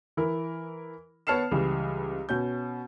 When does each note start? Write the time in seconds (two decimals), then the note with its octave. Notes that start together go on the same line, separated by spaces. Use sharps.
0.17 E3 E4 A#4
1.27 B3 C#5 A5 F6 C7 E7
1.52 C#2 E3 G3
2.29 B2 C#4 G6